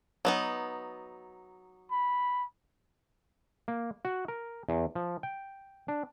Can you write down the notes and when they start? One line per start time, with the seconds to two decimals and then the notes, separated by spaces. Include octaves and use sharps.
0.25 F#3 B3 D#4
1.91 B5
3.68 A#3
4.05 F#4
4.28 A#4
4.69 E2
4.95 F3
5.23 G5
5.88 D4